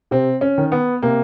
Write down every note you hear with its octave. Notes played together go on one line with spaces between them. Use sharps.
C3 C4
C#4
D#3
B3
C3 A#3